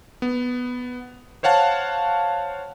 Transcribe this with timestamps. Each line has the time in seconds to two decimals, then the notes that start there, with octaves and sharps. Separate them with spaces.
0.22 B3
1.43 C5 C#5 F5 F#5 A5